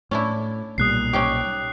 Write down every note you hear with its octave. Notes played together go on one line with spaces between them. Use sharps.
A2 C#4 D4 E4
B1 A#2 G3 D#6 F#6 C7
C#4 D#4 G4